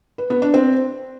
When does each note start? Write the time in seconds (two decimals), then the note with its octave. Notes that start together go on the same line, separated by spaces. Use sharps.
0.18 B4
0.30 B3
0.42 D4
0.54 C4